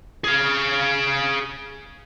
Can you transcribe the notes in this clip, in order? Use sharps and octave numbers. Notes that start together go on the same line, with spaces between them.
G#4 F5